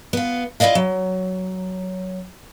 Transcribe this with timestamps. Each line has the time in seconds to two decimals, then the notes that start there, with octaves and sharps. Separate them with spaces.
0.13 B3 F4
0.60 E4 F4 D5 D#5 F5
0.75 F#3